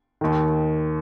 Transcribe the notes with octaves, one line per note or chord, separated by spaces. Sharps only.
D#2 D#3